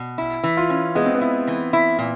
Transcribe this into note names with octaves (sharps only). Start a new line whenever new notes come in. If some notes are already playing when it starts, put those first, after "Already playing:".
Already playing: B2
E4
E3
F4
C#4
G#3 B3
C4
B3
E4
E3
E4
A#2